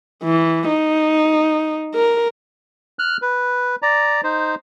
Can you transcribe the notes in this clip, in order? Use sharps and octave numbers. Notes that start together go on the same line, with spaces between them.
E3
D#4
A#4
F6 F#6
B4
D5 A#5
D#4 C5